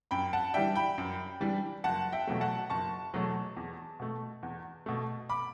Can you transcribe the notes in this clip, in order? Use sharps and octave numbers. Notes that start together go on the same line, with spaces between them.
F#2 G5 B5
F#5 A5
E3 G3 D4 E5 G5
G5 B5
F#2
E3 G3 D4
F#1 F#5 A5
E5 G5
E2 B2 F#3 A3
F#5 A5
F#1 A5 C#6
E2 B2 F#3 A3
E2
B2 A3
E2
B2 A3
B5 D6